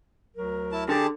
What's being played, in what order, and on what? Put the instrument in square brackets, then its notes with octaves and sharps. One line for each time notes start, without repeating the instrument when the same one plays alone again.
[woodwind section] D2 F#3 A#4
[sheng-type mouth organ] E4 A5
[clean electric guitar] D3 [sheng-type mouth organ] G4 G#4 A5